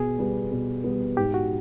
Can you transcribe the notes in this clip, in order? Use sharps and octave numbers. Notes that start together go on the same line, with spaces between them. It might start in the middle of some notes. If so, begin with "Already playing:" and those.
Already playing: B2 G#4
G3 B3
B2
G3 B3
G#2 G4
F#4